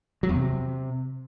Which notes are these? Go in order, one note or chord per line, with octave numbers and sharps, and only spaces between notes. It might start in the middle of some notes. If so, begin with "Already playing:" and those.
F#3
E2
C3